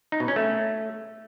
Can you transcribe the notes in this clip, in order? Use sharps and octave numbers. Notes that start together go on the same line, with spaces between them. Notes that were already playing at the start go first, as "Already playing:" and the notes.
D#4
B2
C#4
A3